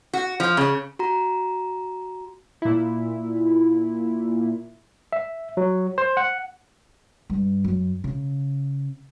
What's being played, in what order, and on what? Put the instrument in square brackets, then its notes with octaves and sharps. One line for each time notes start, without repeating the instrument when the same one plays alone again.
[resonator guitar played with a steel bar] F#4
F3
C#3
[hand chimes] F#4 A#5
[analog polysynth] A#2 E4
[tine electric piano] E5
F#3
C5
F#5
[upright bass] G2
F#2
C#3